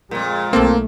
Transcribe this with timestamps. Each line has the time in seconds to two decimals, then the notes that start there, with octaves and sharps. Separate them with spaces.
0.11 F2 A#2 G#3
0.53 B1 A3 A#3 C4 A4